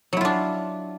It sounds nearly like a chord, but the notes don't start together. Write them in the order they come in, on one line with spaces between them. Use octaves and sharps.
F#3 E4 F4 D4